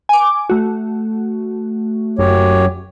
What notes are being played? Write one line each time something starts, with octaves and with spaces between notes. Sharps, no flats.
G#5 D6
A3 F#4
F#1 F#2 G4 C#5